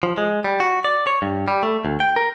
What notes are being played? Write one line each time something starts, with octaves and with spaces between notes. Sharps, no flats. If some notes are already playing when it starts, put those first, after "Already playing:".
F3
G#3
G3
F#4
D5
C#5
G2
G3
A3
D2
G5
A#4